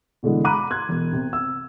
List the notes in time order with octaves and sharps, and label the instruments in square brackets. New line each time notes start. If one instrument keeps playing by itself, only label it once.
[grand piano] B2 D3 E3 G#3
A#5 B5 D6 F#6 D#7
C6 F#6 G#6
E1
C3
E6